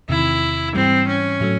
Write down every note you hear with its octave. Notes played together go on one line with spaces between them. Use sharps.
E2 C3 D#3 E4
G#2 E3 G3 C4
C#4
A2 F#3 A3